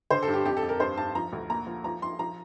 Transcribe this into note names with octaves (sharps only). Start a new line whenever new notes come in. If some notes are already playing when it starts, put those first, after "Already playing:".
D3 C5
G2 A4
G4
F2 G4
A4
F2
A#4
G2 C5
G2 A5
F3 A#5
D2
A#2 A#5
F3
F3 A#5
F3 C6
F3 A#5